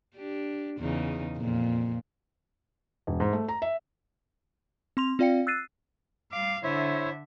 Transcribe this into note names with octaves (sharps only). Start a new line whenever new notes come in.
D4 G4
E2 C#3 D#4
F2 A#2
E1
G#2
A3
A#5
E5
C4 C6 F7
C4 F4 D5 F5 G5 C#7
E6 F#6 A6 C7 D#7
G3 F5 D6
D3 E4 C5 C#5 E5